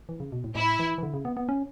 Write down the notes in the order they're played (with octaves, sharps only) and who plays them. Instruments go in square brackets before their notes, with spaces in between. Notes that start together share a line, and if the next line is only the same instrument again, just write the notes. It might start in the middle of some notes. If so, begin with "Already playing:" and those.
[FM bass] E3
C#3
B2
A2
[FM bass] A2 [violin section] E4
[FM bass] E3
E3
D3
C#3
B3
B3
C#4